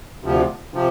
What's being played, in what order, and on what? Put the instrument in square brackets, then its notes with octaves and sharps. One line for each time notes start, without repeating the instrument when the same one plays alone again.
[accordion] D2 C3 F3
C3 F3